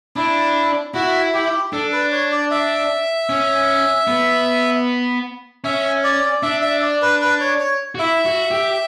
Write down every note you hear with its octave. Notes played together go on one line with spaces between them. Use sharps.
D4 E4
E4 F#4
G4
D4 A4
B4
C#5
D5
E5
C#4
B3
C#4 E5
D5
D4 E5
E5
D5
B4
B4
C#5
C#5
F#4
E4 E5
F#4
G4